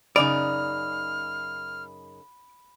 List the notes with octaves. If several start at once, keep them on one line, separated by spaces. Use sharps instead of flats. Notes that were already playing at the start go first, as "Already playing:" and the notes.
F#2 C#3 D#4 D5 B5 F6